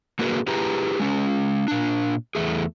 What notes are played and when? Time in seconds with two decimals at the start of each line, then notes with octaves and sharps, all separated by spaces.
0.19 D3 A#3 F#4 G#4 A#4 B4
0.47 E4 G4 G#4 B4 A#5
1.00 G#3 C#4
1.68 A#2 D4
2.35 E2 A3 G#4